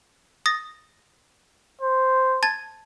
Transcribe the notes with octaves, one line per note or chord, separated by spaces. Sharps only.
D#6 A6 A#6
C5
A5 G#6 A6